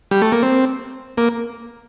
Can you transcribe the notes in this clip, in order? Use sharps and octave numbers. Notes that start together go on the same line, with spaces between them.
G3
A3
A#3
C4
A#3